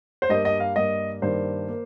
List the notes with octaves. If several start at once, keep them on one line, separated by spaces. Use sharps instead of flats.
C5
G2 G3 A#3 D#5
D#5
F5
G2 G3 A#3 D#5
G2 D#3 A#3 C5
A#3